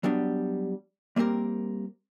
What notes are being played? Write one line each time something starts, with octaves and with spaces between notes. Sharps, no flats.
F#3 G3 B3 D4
G3 A#3 C4 G4 A#4